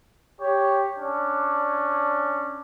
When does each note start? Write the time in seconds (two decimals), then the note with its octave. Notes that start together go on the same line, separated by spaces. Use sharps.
0.40 G4 C#5
0.98 C#4 D4